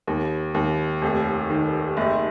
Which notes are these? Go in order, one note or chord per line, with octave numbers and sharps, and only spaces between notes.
D#2
D#2
F1
D#3
F#1